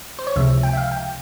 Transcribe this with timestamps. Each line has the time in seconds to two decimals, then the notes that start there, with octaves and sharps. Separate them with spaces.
0.19 C5
0.27 C#5
0.36 C#2 C3 F3 G#3 E5
0.63 G5
0.73 E5
0.77 F5
0.92 G5